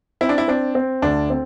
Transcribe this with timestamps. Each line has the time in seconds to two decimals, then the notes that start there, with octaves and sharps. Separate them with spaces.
0.21 C4 E4
0.29 D4
0.38 E4
0.48 C4 D4
0.75 C4
1.02 D2 D4
1.30 C4